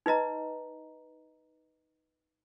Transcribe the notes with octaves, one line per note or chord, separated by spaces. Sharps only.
D#4 B4 D#5 A#5